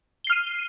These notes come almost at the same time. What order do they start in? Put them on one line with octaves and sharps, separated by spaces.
G7 C7 F6 D#7